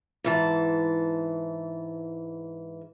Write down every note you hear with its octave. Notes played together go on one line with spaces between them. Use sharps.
G#2 E3 A5